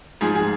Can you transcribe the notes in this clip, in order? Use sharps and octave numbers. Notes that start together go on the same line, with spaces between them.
G#2 F3 G#4
G#4